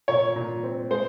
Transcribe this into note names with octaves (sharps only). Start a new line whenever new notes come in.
A#2 C#5
A#2
C4
G#3 C5